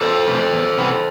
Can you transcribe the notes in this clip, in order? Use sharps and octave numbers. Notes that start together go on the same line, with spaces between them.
E2 A4 C5
C3 E3 A3 C4
E2
C3 E3 B3